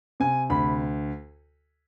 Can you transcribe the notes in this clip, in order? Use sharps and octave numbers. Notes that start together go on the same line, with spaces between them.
C3 G#5
D2 B5